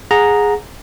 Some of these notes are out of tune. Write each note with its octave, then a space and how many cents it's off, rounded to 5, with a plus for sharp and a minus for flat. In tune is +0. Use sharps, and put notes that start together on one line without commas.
G#4 -5 F#5 -25 A#5 +0